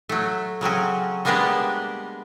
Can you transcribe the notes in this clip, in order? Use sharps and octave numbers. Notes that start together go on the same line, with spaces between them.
F#3 A3
C#3 F#3 C4 C#4
G3 G#3 A#3 B3 D4 G4